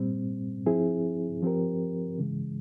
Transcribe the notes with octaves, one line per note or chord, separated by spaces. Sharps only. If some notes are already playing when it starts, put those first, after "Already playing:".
Already playing: A#2 G3 C4
F3 C4 E4 G#4
F3 C4 G4 A#4
C#3 E3 G#3